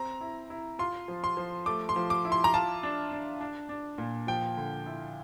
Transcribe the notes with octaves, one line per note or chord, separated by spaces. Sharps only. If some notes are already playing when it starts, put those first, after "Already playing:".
Already playing: C4 A#5
E4
E4
F4 C6
F3
C6
F3
A3 D6
C6
F3
D6
E4
C6
A#5
F4 A5
D4
D4
D4
D4
A#2
F3 G5
D3
E4